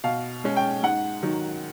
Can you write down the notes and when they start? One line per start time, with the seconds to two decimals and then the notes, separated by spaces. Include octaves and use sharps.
0.04 B2 F5
0.44 G#3 C#4
0.57 G5
0.83 G#2 F#5
1.23 D#3 F#3